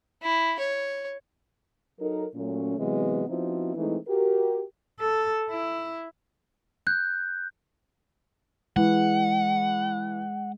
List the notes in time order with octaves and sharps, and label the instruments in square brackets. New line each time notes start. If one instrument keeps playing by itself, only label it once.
[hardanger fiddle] E4
C#5
[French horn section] F#3 D#4 A4 A#4
A#2 F#3 A3 C#4
C3 E3 F#3 G#3 B3 C4
F3 B3 C4 D#4 E4 F#4
E3 G#3 A3 C4 D#4 E4
F#4 G4 A#4
[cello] A4
E4
[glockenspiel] F#6 G6
[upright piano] E3 [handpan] G#3 [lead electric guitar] F#5